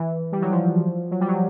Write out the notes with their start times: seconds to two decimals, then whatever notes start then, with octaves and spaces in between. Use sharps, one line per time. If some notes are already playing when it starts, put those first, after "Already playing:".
Already playing: E3
0.32 G3
0.41 F#3
0.51 F3
1.11 F#3
1.20 G3
1.28 F#3